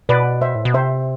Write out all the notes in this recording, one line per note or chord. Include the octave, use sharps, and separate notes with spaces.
B2 B4 D5
C5 E5
A2
B2
C3 C5 E5